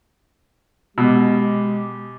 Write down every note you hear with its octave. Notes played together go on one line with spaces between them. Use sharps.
B2 G#3 G4